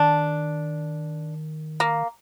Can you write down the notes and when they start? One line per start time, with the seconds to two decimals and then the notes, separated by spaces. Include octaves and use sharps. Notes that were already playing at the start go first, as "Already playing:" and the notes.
Already playing: D#3 D4
1.80 A#3